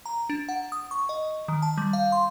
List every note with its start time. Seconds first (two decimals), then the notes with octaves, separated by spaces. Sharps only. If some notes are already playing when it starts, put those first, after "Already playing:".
0.06 A#5
0.30 D4
0.49 F#5
0.72 D#6
0.91 C#6
1.09 D#5
1.48 D#3
1.62 A5
1.77 G3
1.93 F5
2.12 C6